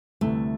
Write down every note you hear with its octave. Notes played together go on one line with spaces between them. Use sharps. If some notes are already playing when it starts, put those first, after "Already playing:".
D2 C3 E3 G3 A3